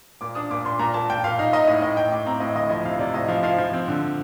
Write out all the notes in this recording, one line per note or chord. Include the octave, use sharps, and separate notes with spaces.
A#2 D6
D4 D#6
A#2 D6
A#2 C6
A#2 A#5
A#2 A5
A#2 G5
A#2 F5
D#4 F5
D#4 D#5
A2 D#5
A2 D#5
A2 G5
A2 D6
C4 A#5
A2 D#5
D2 D#5
F3 D#5
C3 F5
C3 D5
A2 D#5
F3 F5
F3 F5
F3
C4
D3